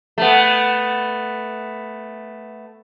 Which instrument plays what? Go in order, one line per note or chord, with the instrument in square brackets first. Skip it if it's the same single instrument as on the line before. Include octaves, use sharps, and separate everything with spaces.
[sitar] A3 B3